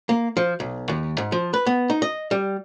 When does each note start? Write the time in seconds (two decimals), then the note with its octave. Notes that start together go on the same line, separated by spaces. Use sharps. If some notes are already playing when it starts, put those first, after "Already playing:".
0.09 A#3
0.37 F3
0.60 B1
0.89 D#2
1.18 G#2
1.32 F3
1.54 B4
1.66 B3
1.90 D#4
2.02 D#5
2.31 G3